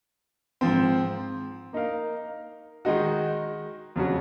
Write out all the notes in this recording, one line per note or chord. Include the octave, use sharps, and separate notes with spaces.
G#2 F3 C4
A#3 D#4 A#4 F5
D#3 G#3 D#4 F#4
F2 C#3 F#3 C#4 F#4